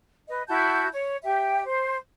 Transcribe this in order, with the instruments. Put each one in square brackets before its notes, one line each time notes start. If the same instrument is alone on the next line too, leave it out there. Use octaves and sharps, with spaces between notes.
[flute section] B4 D#5
E4 F#4 A5 G6
C#5
G4 E5 G5
C5